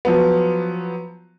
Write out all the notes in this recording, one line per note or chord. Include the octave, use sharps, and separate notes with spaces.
F3 F#3 B3